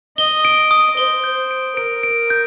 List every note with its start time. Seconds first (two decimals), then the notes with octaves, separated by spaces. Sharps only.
0.18 D#5 G7
0.45 D7
0.71 D#6
0.97 C5 G7
1.24 G6
1.51 D7
1.77 A#4 D7
2.03 D7
2.30 G6